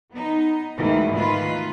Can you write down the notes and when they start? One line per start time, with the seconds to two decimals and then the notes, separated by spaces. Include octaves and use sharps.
0.13 B3 D#4
0.76 D2 G#2 B2 D#3 E3
1.16 D#3 F4 B4